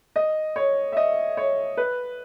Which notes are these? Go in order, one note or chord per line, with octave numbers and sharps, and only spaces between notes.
D#5
C#5
E5
D#5
C#5
B4